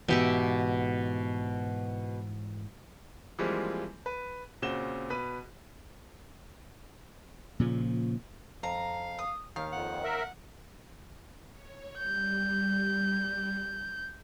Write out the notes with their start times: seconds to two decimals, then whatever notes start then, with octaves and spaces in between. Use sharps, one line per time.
0.08 G#2 B2 E3 G4 E5
3.39 E3 F3 G3 G#3 A#3 C4
4.06 B4
4.62 A#2 C#3 C4 F#4 E7 G7
5.10 B2 B4 B5 D#7
7.60 A#2 C#3 F3
8.63 F2 F5 A#5
9.19 D#6
9.56 D#2 D#3 F5
9.72 F2 F#5
10.04 A#4 E5
11.50 C#5
11.98 G3 G6